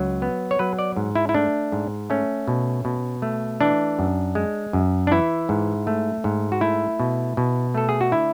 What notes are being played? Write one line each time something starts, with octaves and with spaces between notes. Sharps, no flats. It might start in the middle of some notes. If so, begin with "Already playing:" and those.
Already playing: C#2 F#3
B3
C#5
F#3 B4
D5
G#2
E4
E4
A3 D4
G#2
A3 C#4
B2
B2
A3
E3 D4
F#2
G#3
F#2
D4
E3 E4
G#2
A3
G#2
F#4
A3 E4
B2
B2
A3 A4
G#4
F#4
D3 E4